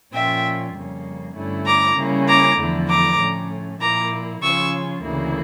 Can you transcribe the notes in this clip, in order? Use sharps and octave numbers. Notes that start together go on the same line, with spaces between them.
A#2 F3 C#4 F4 E5 G5
F2 C#3 G3 A#3 C#4
G2 D3 A3 C#4 E4
A#5 D6
C#3 G3 A#3 C#4 E4
A#5 D6
E2 D3 F3 A3 E4
A#5 D6
A2 F3 A3 C#4
A#2 F3 A#3 E4 A#5 D6
C#3 F3 C#4 F4 C#6 E6
D2 C#3 E3 A#3 E4